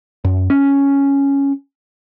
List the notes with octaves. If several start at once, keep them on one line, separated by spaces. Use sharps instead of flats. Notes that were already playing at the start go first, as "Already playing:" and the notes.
F#2
C#4